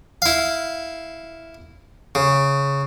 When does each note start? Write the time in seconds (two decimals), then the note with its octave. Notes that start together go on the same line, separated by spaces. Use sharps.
0.22 E4 F5
2.15 C#3